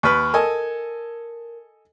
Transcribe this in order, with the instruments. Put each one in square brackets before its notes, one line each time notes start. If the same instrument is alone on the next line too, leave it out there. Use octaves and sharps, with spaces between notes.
[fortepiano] D#2 B4 [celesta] C#6 F6
[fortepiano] A4 D#5 G#5 [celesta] A#4